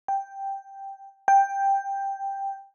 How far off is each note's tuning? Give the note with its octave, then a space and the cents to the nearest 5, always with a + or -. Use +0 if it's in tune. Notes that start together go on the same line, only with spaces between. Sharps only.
G5 +0
G5 +5